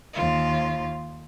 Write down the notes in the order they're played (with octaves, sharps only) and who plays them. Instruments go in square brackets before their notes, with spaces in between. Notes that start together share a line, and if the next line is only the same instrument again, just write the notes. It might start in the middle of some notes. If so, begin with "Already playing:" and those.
[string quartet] D#2 F4